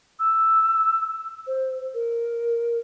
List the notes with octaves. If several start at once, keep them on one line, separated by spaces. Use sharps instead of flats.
E6
C5
A#4